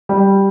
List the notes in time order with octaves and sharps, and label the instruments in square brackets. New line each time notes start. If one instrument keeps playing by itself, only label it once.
[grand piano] G3